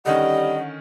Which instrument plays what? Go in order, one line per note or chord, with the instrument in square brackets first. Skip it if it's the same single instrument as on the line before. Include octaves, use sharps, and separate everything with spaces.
[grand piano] D3 D#3 C#4 [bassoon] G3 [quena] D#5 [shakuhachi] F#5